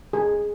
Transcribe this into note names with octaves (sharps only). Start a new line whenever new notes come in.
G#4